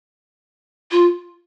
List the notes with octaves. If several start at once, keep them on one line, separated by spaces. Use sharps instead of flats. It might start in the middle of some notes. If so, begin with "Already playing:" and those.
F4